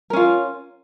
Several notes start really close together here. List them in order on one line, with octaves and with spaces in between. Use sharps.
A#4 C#4 F4